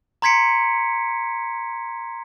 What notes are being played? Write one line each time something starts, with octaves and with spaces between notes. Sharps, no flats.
A#5 C6 G#6 B6 C#7 D7